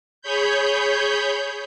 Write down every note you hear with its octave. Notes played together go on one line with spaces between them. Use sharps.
G#4 C#5 B5 G6